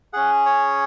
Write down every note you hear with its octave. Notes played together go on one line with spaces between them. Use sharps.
C#4 G#4 F#5
C#5